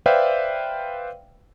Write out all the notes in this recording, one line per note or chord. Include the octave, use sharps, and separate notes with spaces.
B4 C5 D5 E5 F5 G5